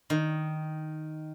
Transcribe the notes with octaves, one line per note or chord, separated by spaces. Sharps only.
D#3